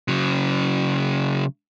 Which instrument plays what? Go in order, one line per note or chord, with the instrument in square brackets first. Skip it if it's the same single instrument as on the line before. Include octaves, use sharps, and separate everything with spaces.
[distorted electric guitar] C#3 F#3